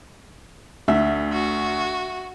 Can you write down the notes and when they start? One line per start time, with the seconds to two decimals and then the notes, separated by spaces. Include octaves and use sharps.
0.88 D2 E5
1.33 F#4